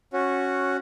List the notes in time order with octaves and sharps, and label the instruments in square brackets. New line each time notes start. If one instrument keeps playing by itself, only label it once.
[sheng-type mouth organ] C#4 F#4